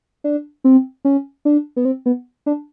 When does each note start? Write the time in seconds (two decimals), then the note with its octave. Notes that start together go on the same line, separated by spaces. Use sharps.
0.24 D4
0.64 C4
1.05 C#4
1.45 D4
1.76 B3
1.85 C4
2.06 B3
2.46 D4